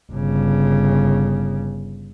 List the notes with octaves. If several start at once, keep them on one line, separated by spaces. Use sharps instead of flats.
G1 C#3